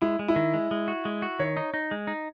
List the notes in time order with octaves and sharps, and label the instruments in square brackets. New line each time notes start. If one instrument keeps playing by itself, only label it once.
[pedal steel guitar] G#3 [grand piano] E4
[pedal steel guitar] G#3
[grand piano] E4
[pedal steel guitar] D#3
G#3
G#3
F#4
G#3
F#4
[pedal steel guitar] D#3 [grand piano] C#5
[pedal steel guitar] D#4
D#4
G#3
D#4